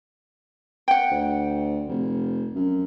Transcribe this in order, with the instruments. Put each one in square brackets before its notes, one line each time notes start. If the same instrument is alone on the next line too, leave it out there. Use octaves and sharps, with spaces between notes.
[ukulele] F#5 G5
[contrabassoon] D2
F1
F#2